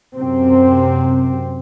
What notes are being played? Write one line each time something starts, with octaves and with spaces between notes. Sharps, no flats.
F#2 C3 C4